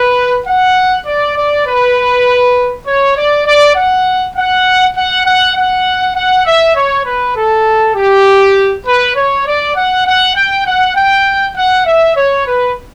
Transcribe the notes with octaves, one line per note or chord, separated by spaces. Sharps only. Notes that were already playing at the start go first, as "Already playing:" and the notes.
Already playing: B4
F#5
D5
D5
B4
C#5
D5
D5
F#5
F#5
F#5
F#5
F#5
F#5
E5
C#5
B4
A4
G4
B4
C#5
D5
F#5
F#5
G5
F#5
G5
F#5
E5
C#5
B4